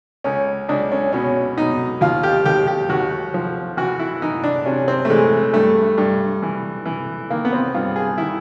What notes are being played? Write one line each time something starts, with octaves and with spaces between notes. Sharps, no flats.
C#2 C#4
C#2 D4
C#4
B2 C#4
B2 D#4
D#2 F4
G4
D#2 G4
G4
D#2 F#4
F3
E3 F#4
E4
E3 D#4
D4
C3 C#4
C4
A3
E3 G#3
G2 A3
G2
E3
E3
D#3 A#3
B3
C4
G2 F4
G#4
D#3 E4